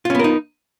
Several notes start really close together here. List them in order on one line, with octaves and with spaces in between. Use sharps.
F4 C#4 B3 A#4 D#4